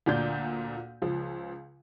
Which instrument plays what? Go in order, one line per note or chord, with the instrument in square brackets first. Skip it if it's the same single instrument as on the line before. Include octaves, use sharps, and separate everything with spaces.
[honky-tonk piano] D2 A#2 D4 G6
C#2 F3